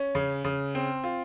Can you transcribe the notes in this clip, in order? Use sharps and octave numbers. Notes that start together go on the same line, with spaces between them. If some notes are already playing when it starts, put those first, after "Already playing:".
Already playing: C#4
C#3
C#3
C4
F4